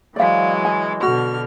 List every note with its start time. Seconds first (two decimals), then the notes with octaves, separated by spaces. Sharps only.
0.16 E3 F#3 G#3 D5 F5
0.65 G#5
1.03 B2 D3 F#4 F6